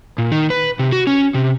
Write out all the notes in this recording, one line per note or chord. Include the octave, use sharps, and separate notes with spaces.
A#2
D#3
B4
C3
F#4
C#4
C3